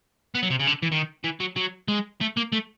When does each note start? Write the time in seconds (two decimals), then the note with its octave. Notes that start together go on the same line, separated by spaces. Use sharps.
0.35 B3
0.42 F#3
0.50 C3
0.59 C#3
0.67 D3
0.83 E3
0.92 D#3
1.24 E3
1.40 F#3
1.56 F#3
1.88 G#3
2.21 A3
2.37 A#3
2.52 A3